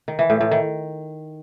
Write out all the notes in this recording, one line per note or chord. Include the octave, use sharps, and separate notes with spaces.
D#3
E3
A2
A2
D#3